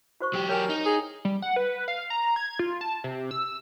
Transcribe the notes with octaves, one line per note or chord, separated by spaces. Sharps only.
F#4 C5 C#6
F#3 G4
A#4 C#5 G5 G#5
D#4
G#4
G3
F#5
B4
F5
A#5
G#6
F4
A5
C3
E6